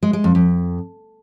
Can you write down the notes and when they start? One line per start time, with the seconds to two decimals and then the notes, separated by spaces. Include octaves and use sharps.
0.03 G#3
0.13 G#3
0.24 F2
0.35 F2